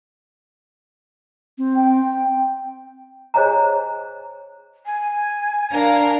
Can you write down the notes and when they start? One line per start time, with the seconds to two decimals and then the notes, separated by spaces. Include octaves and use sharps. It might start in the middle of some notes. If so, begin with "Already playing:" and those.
1.58 C4
1.75 G5
3.34 G#4 C5 C#5 D#5 G#5 A#5
4.86 G#5
5.72 D4 A#4 F5 A#5